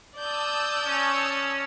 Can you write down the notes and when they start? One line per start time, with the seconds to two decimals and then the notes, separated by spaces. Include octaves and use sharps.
0.16 D5 A5 D#6 E6 G6
0.85 C#4